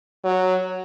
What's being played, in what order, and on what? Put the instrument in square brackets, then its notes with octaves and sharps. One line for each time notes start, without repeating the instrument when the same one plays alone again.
[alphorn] F#3